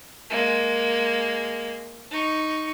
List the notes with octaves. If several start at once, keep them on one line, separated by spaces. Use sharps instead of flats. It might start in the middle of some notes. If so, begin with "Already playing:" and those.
G#3 A#3
D#4 C#6